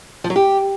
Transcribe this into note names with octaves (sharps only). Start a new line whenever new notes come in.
F3
F#3
G4